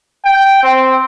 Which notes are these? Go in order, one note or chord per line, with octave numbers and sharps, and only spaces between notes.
G5
C4